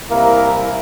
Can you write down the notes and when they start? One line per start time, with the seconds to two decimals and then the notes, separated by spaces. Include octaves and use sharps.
0.10 C2 A#3 E4 A#4